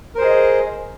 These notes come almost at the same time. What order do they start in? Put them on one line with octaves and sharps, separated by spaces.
A#4 C5 G#4 D#5